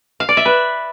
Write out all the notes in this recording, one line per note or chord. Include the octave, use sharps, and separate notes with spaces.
F5
D5
E5
B4